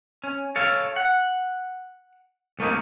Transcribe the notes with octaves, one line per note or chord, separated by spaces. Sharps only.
C#4
A4 C#5 F5
F#5
C2 A3 A#3 D#4